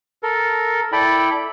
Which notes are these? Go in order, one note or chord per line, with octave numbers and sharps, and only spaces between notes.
A4 A#4
E4 A4 D5 G5 B5